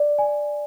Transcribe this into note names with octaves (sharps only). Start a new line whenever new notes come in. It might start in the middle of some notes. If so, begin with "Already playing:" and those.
Already playing: D5
G#5